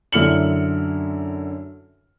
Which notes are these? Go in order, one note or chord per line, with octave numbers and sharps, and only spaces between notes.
F#2 D3 E4 F6 C#7 F#7